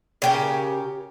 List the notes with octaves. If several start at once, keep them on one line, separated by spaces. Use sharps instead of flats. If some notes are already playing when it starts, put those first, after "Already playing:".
C#3 G4 A#4